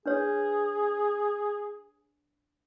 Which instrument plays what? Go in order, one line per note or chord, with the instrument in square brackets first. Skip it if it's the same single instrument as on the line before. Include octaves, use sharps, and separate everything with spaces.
[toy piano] D4 B4 C#5 [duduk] G#4